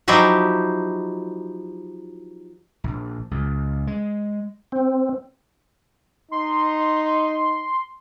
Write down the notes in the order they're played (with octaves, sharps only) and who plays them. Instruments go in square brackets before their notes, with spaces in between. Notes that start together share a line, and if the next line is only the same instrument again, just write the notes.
[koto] F3 F#3 D#4 E4 G4 D#5
[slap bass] A#1
C#2
G#3
[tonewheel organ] C4
[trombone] D#4 [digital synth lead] C6